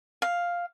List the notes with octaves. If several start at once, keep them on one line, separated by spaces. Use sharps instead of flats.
F5